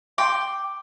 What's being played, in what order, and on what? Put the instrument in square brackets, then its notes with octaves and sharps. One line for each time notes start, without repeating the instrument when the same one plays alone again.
[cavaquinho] G5 C6 D6